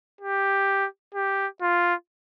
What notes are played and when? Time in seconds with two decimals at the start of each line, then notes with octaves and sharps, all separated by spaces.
0.21 G4
1.15 G4
1.62 F4